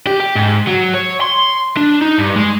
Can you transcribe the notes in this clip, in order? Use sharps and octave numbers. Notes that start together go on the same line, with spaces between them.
G4
G4
G#2
F#3
C#5
C6
D4
D#4
G2
G#3